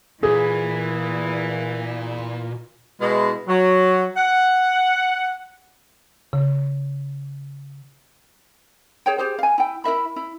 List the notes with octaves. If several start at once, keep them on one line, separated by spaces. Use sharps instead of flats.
A#2 E3 G#4
B2 G#3 E4
F#3
F#5
C#3
G#4 C#5 G5
G4 G#4 C5
F5 G#5
E4 G5
E4 A#4 E5 B5
E4